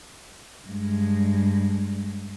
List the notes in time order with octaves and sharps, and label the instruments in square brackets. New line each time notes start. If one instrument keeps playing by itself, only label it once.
[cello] G2 G#3